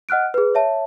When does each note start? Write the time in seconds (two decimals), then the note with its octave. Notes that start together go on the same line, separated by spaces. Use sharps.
0.09 D#5 F#5 F6 F#6 D7
0.34 G#4 B4
0.54 C#5 E5 A5